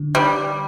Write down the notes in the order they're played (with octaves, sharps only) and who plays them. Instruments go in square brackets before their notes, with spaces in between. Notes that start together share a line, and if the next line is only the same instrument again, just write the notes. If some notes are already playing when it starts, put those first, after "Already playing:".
Already playing: [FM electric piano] D3
[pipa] G3